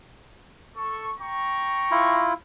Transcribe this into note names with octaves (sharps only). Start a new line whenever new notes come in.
A4 C#6
G5 A#5 C#6
E4 F4